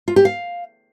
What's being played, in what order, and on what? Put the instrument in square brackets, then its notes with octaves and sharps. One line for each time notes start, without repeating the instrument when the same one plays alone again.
[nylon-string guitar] F4
G4
F5